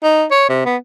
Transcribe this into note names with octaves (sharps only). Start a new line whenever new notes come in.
D#4
C#5
C3
B3